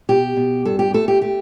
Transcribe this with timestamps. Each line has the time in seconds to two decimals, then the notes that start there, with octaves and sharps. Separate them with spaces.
0.09 B2 G4
0.36 B2
0.65 G2 A4
0.79 G4
0.94 A3 A4
1.08 G4
1.22 A3 G4